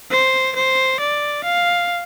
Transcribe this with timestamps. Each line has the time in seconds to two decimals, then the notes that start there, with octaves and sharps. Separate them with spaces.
0.11 C5
0.55 C5
1.00 D5
1.44 F5